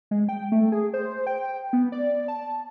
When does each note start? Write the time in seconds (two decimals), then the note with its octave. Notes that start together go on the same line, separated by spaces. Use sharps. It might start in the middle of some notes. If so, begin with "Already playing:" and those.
0.11 G#3
0.29 G5
0.52 A3
0.72 G#4
0.94 C5
1.27 G5
1.73 B3
1.92 D5
2.28 A5